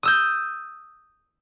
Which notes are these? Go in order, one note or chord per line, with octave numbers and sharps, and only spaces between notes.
D#6 E6 G6